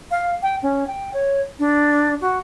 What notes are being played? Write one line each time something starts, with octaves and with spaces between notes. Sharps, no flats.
F5
G5
C#4
G5
C#5
D4
F#4